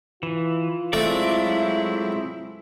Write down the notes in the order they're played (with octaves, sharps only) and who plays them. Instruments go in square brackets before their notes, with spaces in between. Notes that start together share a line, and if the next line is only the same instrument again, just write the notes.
[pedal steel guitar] E3 [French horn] F4
[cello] F#3 E4 [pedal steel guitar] G#3 C4 D5 [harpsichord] A3